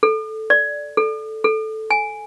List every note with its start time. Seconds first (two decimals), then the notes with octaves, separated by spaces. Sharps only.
0.03 A4
0.50 D5
0.97 A4
1.44 A4
1.91 G#5